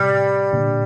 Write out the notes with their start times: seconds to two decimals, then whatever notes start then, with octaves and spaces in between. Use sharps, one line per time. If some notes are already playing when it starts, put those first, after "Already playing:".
Already playing: A2 C3 G3
0.52 A#2 D3